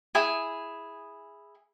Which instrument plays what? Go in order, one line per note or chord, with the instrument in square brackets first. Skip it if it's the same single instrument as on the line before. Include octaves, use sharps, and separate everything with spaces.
[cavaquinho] E4 G#4 G#5